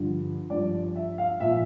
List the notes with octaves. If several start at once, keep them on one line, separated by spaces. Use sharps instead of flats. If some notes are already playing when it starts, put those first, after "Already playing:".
Already playing: G2 D3 F3
G2 F3 D5
E5
F5
A#2 F3 E5